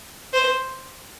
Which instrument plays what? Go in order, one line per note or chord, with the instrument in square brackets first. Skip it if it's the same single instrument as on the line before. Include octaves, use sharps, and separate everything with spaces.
[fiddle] C5